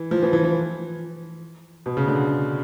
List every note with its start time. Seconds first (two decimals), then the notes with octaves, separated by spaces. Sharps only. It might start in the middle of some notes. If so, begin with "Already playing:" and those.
Already playing: E3
0.11 F3
0.22 E3
0.33 E3
0.44 E3
1.86 B2
1.97 C#3
2.08 D3